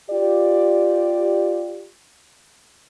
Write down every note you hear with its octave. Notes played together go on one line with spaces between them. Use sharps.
F4 G4 D5